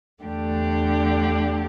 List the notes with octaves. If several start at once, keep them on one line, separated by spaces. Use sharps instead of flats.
E2 D3 A3 D4 G4